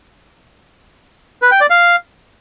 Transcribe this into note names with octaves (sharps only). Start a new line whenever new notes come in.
B4
G5
D5
F5